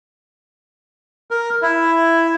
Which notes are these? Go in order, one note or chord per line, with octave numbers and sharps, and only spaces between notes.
A#4
E4